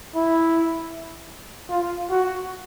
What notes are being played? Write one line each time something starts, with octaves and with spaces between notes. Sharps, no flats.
E4
F4
F#4